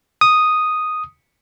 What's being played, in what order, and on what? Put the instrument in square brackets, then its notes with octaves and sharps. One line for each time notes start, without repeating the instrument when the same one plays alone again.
[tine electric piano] D#6